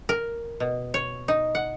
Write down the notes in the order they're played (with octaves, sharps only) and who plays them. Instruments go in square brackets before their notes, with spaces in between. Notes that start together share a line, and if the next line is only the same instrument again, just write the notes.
[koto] A#4
B2
C#5
D#4
F#5